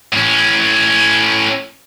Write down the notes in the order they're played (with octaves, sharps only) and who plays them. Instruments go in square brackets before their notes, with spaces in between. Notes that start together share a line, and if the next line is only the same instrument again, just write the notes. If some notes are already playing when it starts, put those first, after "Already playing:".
[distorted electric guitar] A2 C#4